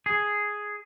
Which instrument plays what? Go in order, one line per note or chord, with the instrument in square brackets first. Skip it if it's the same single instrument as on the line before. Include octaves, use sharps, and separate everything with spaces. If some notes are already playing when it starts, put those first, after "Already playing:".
[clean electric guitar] G#4